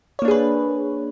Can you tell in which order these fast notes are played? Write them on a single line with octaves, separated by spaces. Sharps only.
C#5 A#3 D4 G#4 B4